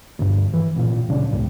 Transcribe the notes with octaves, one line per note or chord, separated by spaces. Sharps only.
D2 G2
E3
A1 A#2
D1 C#3 D4
C#2 A2